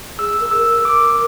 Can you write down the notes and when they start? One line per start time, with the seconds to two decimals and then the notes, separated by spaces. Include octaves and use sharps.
0.19 G#4 E6
0.40 A#4
0.51 E6
0.62 A#4
0.85 A#4 D6